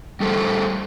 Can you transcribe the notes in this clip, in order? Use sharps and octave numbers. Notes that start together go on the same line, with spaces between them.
G3 A3 A4 C5